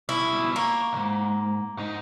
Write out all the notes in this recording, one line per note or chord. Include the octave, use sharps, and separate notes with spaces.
B2 G3 E4
A#3 F4 C#5
B1 G#2
G#2 D#4